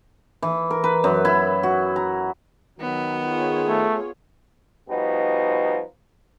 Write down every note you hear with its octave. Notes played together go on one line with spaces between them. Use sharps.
E3
A#4
B4
F#2
E4
F#4
A#5
D#3 F#3 B3
F4 G#4 C#5
A3
B2 F3 G3 D#4 F#4